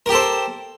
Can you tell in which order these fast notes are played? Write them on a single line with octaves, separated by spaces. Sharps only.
A#4 G4 A4 C5